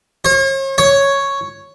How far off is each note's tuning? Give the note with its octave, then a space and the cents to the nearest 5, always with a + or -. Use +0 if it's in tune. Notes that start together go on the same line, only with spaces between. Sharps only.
C#5 -45
C#5 +0